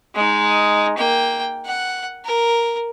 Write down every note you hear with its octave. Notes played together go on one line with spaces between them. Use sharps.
G#3 D#4
A#3 G5
F#5
A#4